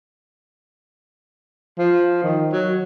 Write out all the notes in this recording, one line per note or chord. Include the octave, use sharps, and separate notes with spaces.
F3
D#3
F#3